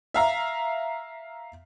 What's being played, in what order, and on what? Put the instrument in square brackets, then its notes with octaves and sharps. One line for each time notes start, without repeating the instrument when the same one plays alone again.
[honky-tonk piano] E5 F5 A#5